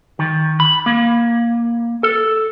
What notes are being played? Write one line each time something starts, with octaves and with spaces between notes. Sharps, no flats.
D#3
B5
A#3
A4